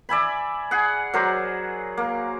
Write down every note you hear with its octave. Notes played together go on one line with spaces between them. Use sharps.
D5 E5 G#5 B5
G#4 F#5
F#3 A#4 C5 D5
A#3